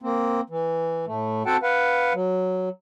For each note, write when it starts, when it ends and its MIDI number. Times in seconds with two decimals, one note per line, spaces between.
0.02 0.41 58
0.02 0.41 60
0.50 1.05 52
1.07 1.43 45
1.07 1.43 57
1.46 1.57 60
1.46 1.57 66
1.46 1.57 69
1.46 1.57 78
1.46 1.57 79
1.46 1.57 81
1.63 2.13 71
1.63 2.13 77
1.63 2.13 78
2.14 2.69 54